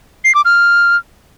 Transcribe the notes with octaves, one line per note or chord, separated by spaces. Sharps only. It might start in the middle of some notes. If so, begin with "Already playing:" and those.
C7
D6
F6